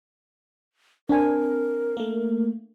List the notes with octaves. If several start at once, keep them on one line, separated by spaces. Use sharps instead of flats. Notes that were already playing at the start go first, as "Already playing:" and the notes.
C4 D4 A#4 G#5
A3 A#3